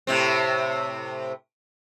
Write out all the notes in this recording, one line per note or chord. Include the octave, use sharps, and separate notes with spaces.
A2 C3 C4